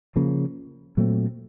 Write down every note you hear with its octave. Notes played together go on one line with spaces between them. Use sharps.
C#3 F3 A#3
A#2 F#3 A3 C4